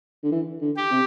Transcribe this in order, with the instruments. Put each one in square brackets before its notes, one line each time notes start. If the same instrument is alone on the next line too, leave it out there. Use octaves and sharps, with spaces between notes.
[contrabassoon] D3
E3
D3
[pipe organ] G4
[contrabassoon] C3